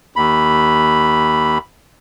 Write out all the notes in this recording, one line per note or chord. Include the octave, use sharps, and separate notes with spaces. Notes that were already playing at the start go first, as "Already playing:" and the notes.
D#2 B5